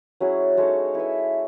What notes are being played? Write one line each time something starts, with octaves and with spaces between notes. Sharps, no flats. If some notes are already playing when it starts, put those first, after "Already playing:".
F#3 C#4 E4 G#4
G#3 D#4 A4 C#5
E4 B4 E5